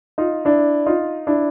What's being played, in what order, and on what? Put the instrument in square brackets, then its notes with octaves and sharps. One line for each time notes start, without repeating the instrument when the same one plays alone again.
[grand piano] D#4 F4
D4 E4
D#4 F4
D4 E4